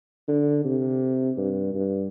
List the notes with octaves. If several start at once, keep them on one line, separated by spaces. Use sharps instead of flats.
D3
C3
G2
G2